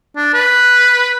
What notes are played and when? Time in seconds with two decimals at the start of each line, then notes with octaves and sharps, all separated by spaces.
0.16 D4
0.34 B4